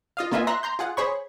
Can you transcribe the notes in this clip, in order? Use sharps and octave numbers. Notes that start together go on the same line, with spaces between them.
F4 D#5 F5
A#3 B3 F4 D#5 E5 G#5
E5 A#5 C6 F#6 A#6
A#5 C6 G6
F4 G#4 F#5
G#4 C5 C#5 B5 C#6